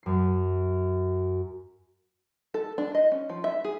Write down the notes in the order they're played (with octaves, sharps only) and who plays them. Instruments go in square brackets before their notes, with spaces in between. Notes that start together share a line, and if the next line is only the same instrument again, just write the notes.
[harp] F#2 C7
[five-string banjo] A4
D4
D#5
C#4
F3
E5
G#4